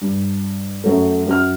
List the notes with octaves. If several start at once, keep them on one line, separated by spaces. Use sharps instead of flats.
G2
F#2 F#3 A3
F#2 F#4 F6